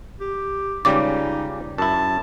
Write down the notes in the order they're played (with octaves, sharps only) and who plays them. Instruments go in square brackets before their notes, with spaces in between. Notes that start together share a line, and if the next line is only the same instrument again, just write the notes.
[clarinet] G4
[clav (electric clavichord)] C#2 C#3 G3 [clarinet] D#4 [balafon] D6
[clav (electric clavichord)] F#2 E4 [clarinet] A5